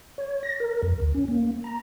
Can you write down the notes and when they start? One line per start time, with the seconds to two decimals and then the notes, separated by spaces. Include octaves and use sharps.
0.18 C#5
0.43 A#6
0.60 A#4
0.83 F2
1.00 D2
1.14 C#4
1.28 A#3
1.64 A#5